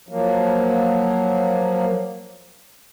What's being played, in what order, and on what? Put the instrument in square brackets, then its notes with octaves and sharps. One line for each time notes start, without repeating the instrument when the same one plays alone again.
[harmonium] F3 F#3 A#3